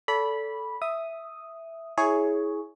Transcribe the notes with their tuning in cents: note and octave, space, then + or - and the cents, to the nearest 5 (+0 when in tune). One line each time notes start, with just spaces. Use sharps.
A4 +0 D5 -40 B5 -10
E5 +0 D#6 +0
E4 -15 G#4 +10 C#5 +0